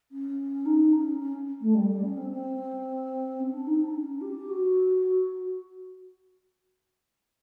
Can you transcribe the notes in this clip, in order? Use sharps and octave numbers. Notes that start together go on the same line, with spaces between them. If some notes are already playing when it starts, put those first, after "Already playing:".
C#4
D#4
C#4
C#4
A3
G3
G3
C#4
C4
C4
C#4
D4
D#4
D4
C#4
G4
F#4